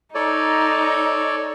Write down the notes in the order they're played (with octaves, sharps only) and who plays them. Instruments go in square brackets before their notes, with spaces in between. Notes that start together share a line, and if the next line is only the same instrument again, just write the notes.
[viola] D#4 [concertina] A4 C#5 D5